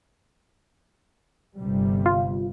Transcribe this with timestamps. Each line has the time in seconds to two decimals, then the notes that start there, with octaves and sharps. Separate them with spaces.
1.57 G1 C3 G3
2.06 F4